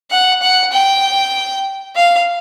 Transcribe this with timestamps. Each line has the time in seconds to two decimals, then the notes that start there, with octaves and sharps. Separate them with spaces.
0.11 F#5
0.42 F#5
0.72 G5
1.96 F5